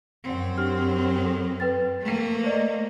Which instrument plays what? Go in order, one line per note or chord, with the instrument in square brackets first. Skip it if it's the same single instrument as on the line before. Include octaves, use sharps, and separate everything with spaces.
[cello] F#2 C4
[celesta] D4 G4 F6
A4
B4 G5 A6
[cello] A3 A#3
[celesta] C5 D5 D#5